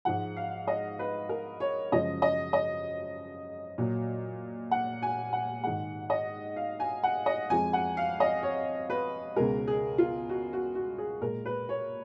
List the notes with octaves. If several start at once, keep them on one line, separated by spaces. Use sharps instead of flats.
G#2 F3 G#3 F#5
F5
D#5
B4
A#4
C#5
F#2 C#3 F3 G#3 D#5
D#5
D#5
A#2 F#3
F#5
G#5
F#5
G#2 D#3 G#3 F#5
D#5
F5
G#5
F#5
D#5
F2 F3 G#3 G#5
F#5
F5
D#5
C#5
B4
C#2 B2 G#3 A#4
G#4
F4
F#4
F#4
F#4
G#4
A#2 G#3 A#4
B4
C#5